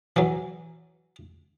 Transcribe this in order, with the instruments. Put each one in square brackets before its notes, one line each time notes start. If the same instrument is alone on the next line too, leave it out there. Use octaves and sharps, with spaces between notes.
[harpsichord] E3 F#3